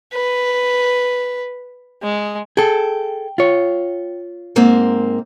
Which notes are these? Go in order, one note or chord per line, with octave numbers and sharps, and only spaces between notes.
B4
G#3
G#4 A4 G5
F4 C#5
G#2 A#3 C4